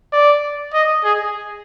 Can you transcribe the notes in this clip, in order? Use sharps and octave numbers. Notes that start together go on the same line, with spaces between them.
D5
D#5
G#4